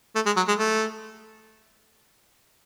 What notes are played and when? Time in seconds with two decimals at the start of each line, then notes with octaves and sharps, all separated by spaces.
0.15 A3
0.26 G#3
0.36 F#3
0.48 G#3
0.59 A3